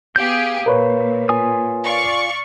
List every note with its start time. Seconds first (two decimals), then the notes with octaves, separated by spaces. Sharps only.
0.16 B3 G4 G#4 F5 G6
0.66 A#2 A#4 B4 C#5
1.29 F4 G#5 D#6
1.83 D5 F5 C#6